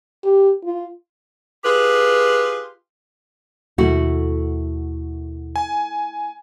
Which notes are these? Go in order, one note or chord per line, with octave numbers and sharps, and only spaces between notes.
G4
F4
F4 G4 G#4 B4
D#2 B2 A3 E4 F#4
G#5